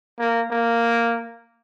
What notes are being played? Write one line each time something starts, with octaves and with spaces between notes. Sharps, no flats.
A#3
A#3